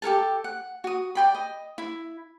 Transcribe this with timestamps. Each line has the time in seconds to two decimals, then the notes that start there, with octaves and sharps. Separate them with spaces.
0.02 G4 A4 A#4 A5
0.44 F#5
0.84 F#4 D#6
1.15 D5 G5 B5
1.35 D#5
1.78 E4